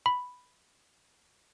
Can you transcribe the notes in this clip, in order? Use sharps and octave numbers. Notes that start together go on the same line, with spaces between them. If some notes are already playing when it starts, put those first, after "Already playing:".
B5